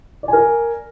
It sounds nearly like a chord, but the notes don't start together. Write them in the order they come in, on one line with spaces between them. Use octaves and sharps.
D5 G#5 A#4